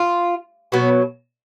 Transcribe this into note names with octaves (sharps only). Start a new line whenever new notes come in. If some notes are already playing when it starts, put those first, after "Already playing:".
Already playing: F4
B2 F#3 B3